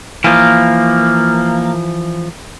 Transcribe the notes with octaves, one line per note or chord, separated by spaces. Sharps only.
E3 F3 A#3